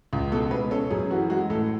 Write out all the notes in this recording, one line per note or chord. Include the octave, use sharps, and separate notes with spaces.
C#2
B2 A4
G#3 B4
C#4 A4
F#2 G#4
E3 F#4
G#3 F#4
A2 A4